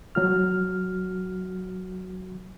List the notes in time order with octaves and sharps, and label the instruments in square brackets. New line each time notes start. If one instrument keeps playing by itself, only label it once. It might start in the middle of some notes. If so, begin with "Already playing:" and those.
[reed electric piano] F#3 F#4 F6